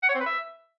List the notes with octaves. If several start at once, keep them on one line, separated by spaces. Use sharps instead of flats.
F#5
C#5
C4
B4
E5